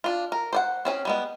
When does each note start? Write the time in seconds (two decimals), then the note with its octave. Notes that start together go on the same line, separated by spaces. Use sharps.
0.04 D4 F4
0.32 A#4
0.53 C5 D5 F#5
0.85 C4 C#4 G#4
1.05 G3 G#3 B3